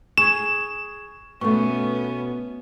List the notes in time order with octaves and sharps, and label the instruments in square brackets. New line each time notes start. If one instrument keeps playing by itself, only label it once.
[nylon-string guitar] G#4 [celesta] C#6 G#6 [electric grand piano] E7
[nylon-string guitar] B2 A3 [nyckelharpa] B3 C#4 [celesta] C#6